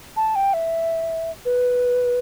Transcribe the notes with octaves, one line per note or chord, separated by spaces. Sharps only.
A5
G5
E5
B4